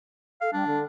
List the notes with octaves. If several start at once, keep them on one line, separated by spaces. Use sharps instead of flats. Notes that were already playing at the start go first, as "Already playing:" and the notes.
A4 F5
G3 D4
D3